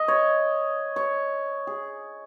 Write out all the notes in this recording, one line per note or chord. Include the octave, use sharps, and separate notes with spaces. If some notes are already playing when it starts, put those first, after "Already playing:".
Already playing: D#5
C#5
C#5
G#4